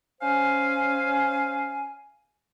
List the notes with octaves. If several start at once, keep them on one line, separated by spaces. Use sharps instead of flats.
C#4 C5 F5 G#5